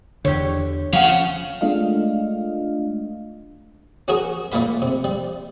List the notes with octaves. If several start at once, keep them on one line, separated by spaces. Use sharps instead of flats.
E2 D3 G4 C#5
F3 C#4 F4 F5 F#5
G#3 A3 D4 F4 D#5 F5
C#4 F#4 G#4 A#4
A#2 A3 A#3 F5 B5
C3
G3